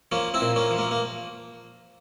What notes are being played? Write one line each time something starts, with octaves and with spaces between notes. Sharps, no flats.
F3 A#3 C#4
C4 E4
A#2
A#3 C#4
F3
A#3
A#3